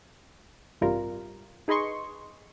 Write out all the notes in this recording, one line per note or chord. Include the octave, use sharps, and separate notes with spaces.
A1 G2 C3 G3 F4 A#4
D#4 G#4 B4 D#5 C6 C#6